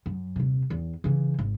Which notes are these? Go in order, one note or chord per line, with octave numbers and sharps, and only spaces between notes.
F#2
D#1 C3
E2
C#3 E3
G#1